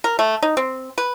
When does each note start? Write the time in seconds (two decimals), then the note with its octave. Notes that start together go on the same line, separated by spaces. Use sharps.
0.04 A#4
0.19 A3
0.43 D#4
0.57 C4
0.98 B4